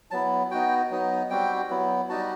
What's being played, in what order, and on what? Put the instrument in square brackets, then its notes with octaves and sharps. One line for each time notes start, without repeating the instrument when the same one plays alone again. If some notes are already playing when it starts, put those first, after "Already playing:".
[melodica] F#3 B3 E4 A5
B3 D#4 F#4 G5
F#3 B3 D#4
G3 C4 F#4 G5
F#3 B3 E4
G3 D#4 F#4 A5